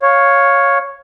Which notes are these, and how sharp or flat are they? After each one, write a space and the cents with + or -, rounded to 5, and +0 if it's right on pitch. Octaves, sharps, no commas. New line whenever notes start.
C#5 +0 F5 +10